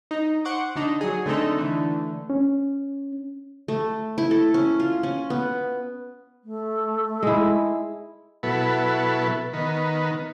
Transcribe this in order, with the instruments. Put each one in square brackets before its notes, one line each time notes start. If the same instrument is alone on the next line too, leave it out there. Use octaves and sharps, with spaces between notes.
[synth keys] D#4
C5 F#5 C#6 D6
D3 D4 D#4
F#3 G#4
D3 A3 C4 D#4 A4
D3 E3 A3
[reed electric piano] C#4
[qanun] A3
E4
A4
C#4
F4
C#4
B3
[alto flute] A3
[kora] G#3 E4
[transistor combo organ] B2 F#3 B3 E4 A4
D#3 B3